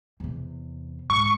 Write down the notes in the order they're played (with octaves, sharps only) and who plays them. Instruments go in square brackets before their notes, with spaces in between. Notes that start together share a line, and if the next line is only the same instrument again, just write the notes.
[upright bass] E2 C3
[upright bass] G#2 [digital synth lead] C#6